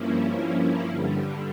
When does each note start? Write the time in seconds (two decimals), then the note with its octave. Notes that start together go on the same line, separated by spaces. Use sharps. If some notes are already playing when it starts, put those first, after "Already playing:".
Already playing: G2 F3 A#3 C#4 E4
0.89 G2 D3 G3